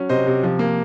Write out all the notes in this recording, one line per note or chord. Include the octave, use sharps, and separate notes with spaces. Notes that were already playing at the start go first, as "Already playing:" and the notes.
Already playing: F#3 C#4
C3 C5 D#5
C3
F3
A#3